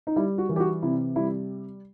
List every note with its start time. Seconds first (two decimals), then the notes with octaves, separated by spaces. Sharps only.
0.07 D#4
0.16 G3 E4
0.38 F#4
0.49 E3
0.56 G4
0.60 F#4
0.82 C3 E4
1.16 G3 E4